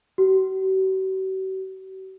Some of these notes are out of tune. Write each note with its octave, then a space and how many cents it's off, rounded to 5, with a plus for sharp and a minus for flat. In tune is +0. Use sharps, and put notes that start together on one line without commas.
F#4 +45